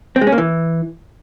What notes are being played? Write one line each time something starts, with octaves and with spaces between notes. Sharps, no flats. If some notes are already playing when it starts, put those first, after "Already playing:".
C4
G#3
C#4
A#3
E3